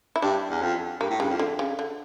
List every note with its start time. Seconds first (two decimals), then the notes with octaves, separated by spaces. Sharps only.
0.16 E4
0.22 G2 D4
0.50 E2
0.62 F2
1.01 G2 A#3
1.10 A2
1.20 G2 C#3
1.30 F2
1.39 D3
1.59 C#3
1.79 D3